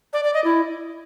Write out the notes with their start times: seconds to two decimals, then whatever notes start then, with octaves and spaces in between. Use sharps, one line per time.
0.13 D5
0.24 D5
0.34 D#5
0.44 E4